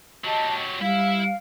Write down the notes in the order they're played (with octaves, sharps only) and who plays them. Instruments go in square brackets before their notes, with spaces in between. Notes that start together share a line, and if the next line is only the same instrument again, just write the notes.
[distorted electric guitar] F#3 G4 [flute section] D#5 A5
[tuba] G3 [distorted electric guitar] E4 E5 [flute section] F5